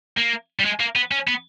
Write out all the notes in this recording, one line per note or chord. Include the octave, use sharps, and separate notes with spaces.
A#3
G3
G#3
A#3
B3
C#4
B3